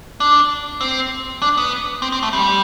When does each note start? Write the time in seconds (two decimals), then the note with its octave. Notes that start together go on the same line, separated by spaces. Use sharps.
0.20 D4
0.81 C4
1.42 D4
1.57 B3
2.02 C4
2.12 C4
2.23 A3
2.33 G3